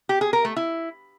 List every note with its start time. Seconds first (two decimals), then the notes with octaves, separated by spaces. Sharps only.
0.09 G4
0.21 G#4
0.33 A#4
0.45 A3
0.56 E4